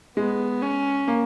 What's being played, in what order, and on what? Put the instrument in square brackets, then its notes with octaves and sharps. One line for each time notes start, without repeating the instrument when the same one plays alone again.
[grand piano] G#3 [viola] B3
[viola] C#4
[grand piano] A#3